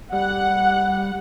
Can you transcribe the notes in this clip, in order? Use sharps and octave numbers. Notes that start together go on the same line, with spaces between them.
G3 F#5